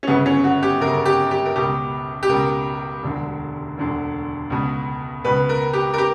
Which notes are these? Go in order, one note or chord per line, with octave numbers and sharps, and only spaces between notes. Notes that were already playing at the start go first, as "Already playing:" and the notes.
C#4
G1 F#2 C#3 B3
C#4
F#4
G4
G1 F#2 C#3 A#4
G4
G4
A#4
C#2 B2 G4
G4
C#2 B2 A#4
E1 D2 D3
E1 D2 D3
C#2 B2
C#2 B2 B4
A#4
G4
A#4
G4